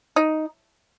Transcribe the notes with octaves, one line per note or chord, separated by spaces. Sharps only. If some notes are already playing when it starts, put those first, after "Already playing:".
D#4